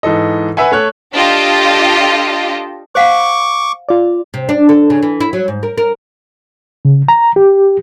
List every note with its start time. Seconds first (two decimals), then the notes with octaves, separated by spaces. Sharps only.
0.03 G#2 E3 A4 D#5
0.57 B4 E5 F#5 G#5
0.72 A3 C#5 F#6
1.14 D4 F4 G4 A4 D#5
2.95 C5 F5 F#5 C#6 D6
3.89 F4 D5
4.34 C3
4.49 D4
4.69 A4
4.90 C#3
5.03 E3
5.20 E4
5.33 F#3
5.48 G#2
5.63 A#4
5.78 A#4
6.85 C#3
7.08 A#5
7.36 G4